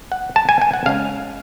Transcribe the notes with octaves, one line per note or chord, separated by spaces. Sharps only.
F#5
A5
G#5
G#5
F#5
C#3 G#3 C#4 F5